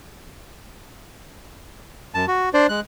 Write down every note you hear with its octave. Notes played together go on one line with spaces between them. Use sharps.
F#2 A5
F#4
D4 C5 D5
G#3 F#6